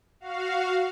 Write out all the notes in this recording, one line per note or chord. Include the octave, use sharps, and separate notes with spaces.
F#4 F5